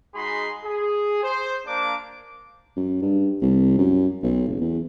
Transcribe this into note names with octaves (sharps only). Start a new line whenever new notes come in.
G#3 D#4 F#4 G#4 B5 C6
G#4
C5
A#3 D4 D6
F#2
G2
C2
F#2
B1
F#1
E2